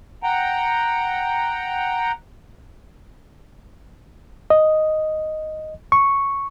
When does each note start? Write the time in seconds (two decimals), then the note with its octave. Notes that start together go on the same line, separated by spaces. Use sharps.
0.23 F#5 G5 A#5
4.50 D#5
5.92 C#6